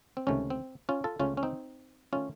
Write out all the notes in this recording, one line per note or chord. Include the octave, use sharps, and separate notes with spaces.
C4
C#2 C3 D#3 A3 C#4
C4
C#4 F4
F4 A4
C#2 C#3 A3 C#4 F4
C#4
C4 D#4
D#3 A3 C#4 F4